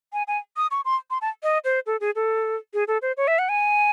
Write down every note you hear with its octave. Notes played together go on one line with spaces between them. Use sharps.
G#5
G#5
D#6
C#6
C6
C6
A5
D#5
C5
A4
G#4
A4
G#4
A4
C5
C#5
E5
F#5
G#5